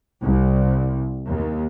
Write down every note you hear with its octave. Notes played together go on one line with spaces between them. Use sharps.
C2
D#2